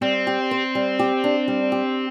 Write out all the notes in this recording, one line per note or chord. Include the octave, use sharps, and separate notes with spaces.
G3 C4
G4
C5
G3
G4
D4
G3
G4